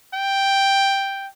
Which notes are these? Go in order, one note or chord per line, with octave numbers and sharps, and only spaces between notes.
G5